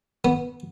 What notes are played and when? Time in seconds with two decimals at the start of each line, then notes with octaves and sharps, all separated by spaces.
0.25 B3